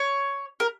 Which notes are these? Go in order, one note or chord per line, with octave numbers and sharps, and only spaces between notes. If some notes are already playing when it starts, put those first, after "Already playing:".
Already playing: C#5
A#4